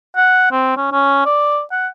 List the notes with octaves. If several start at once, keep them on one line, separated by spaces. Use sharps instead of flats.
F#5
C4
C#4
C#4
D5
F#5